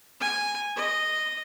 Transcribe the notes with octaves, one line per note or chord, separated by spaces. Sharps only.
G#5
D#5